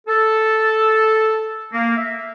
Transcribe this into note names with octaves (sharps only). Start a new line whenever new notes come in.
A4
A#3
E5